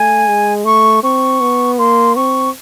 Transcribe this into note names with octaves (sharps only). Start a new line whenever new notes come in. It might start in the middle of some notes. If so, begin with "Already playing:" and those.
Already playing: A3 G#5
G#3
A3 C#6
C4 C#6
B3
A#3 C6
C4 C#6